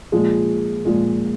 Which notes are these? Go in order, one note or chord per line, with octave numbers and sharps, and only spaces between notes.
A#2 F3 G#3
A#2 F3 G#3